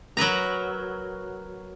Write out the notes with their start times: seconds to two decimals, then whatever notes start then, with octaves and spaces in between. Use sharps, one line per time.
0.17 F#3 A#4 B4 A#5